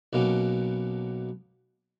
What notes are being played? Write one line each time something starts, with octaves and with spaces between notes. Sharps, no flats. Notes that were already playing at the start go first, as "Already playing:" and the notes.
B1 B2 A#3 C#4